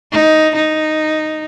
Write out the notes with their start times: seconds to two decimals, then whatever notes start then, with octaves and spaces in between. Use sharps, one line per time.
0.12 D#4
0.55 D#4